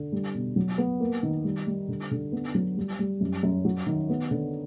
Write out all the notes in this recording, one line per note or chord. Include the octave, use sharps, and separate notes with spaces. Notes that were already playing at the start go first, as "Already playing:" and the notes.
Already playing: D3
G3
B2
F#3
B3
A#3
D#3
G3
G3
D3
D3
B3
F#3
G3
G3
F#2
F#2
F#3
D#3
B3
D3